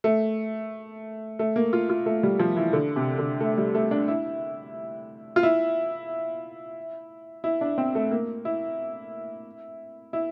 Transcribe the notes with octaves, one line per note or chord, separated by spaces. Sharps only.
A3
A3
A#3
F4
F4
A3
G3
F3
E3
D3
C3
D3
A3
G3
A3
D4
E4
F4
E4
E4
D4
C4
A3
A#3
E4
E4